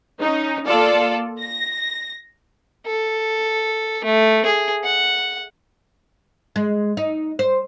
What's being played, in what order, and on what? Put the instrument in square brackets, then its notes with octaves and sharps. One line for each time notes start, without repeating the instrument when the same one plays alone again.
[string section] C#4 D#4
A#3 F4 A4 D5
A#6
[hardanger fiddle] A4
A3
G#4
F#5
[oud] G#3
D#4
C5